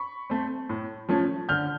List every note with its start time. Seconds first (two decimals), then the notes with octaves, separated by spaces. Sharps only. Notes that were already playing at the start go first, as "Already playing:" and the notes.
Already playing: B5 C#6
0.30 A3 C4
0.69 A2
1.09 F3 A3 C#4
1.49 D3 F6 G6